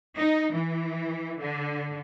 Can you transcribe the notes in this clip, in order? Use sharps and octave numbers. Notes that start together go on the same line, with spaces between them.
D#4
E3
D3